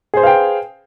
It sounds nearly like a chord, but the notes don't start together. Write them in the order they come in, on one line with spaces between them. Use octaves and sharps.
G#4 C5 B4 F5 G5